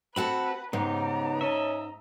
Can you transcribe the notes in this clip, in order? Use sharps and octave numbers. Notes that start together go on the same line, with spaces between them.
C4 F#4 A4 B4 F#5 B5
G#2 C#3 B3 D#4 G4 A#5
C#4 D#5 E5